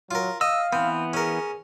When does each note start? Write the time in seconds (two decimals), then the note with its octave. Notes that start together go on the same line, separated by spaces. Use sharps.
0.11 F#3 F4 A#4
0.41 D#5 F5 E6
0.73 E3 B3 C4
1.13 C#4 G#4 A#4